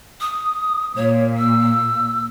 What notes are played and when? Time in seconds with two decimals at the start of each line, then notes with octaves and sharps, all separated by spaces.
0.21 D#6
0.96 A#2 C#5
1.38 E6